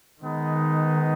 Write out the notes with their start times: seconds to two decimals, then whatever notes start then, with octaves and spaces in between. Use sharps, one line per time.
0.22 D#3 G#3 B3 D#4